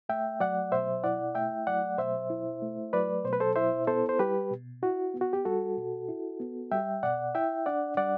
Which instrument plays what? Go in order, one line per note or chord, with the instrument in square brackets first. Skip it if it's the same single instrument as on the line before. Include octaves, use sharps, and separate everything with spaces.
[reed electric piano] A3 E5 G5
F#3 D5 F#5
B2 C5 E5
E4 D5 F#5
A3 E5 G5
F#3 D5 F#5
B2 C5 E5
E4
A3
F#3 B4 D5
B2 C5
B4
A4 C5
E4 C5 E5
B3 A4 C5
C5
G3 G4 B4
B2
E4 F#4
B3
F#4
G4
G3 F#4 A4
B2
E4
B3
G3 E5 G5
B2 D5 F#5
E4 E5 G5
D4 D5 F#5
G3 D5 F#5